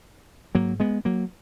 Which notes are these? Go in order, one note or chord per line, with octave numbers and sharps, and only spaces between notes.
G#2 F#3 A#3
G#3 B3
F#3 A#3